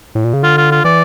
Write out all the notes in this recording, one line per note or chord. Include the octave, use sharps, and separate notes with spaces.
A2
A#2
C#3
D3 F4
F4
F4
E3 D5